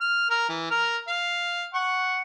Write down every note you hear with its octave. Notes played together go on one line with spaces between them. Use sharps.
F6
A#4 F6
E3
A#4 F6
F5
F#5 C#6